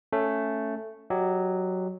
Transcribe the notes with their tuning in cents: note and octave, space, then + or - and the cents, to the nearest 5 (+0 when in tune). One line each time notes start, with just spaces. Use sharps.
A3 +5 C#4 +0
F#3 +0 G4 +0 D#5 -20